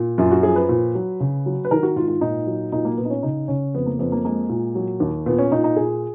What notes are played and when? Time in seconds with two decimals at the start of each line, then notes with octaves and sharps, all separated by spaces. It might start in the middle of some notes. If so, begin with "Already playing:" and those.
Already playing: A#2
0.18 F#2 F4
0.31 F#4
0.43 F3 G#4
0.56 B4
0.69 A#2
0.95 F#3
1.20 C#3
1.46 F#3
1.65 B4
1.71 D#3 A#4
1.83 F#4
1.96 G#2 F4
2.08 F4
2.21 A#2 D#4
2.47 F#3
2.72 A#2 D#4
2.85 A#3
2.97 A#2 B3
3.05 D#4
3.10 C#4
3.23 C#3 D#4
3.48 C#3 C#4
3.74 F2 B3
3.86 A#3
3.99 F2 B3
4.12 A#3
4.24 G#3 A#3
4.49 A#2
4.75 F#3
5.00 D#2
5.26 A#2 B3
5.38 C#4
5.51 A#2 D#4
5.64 D#4
5.76 A#2 G#4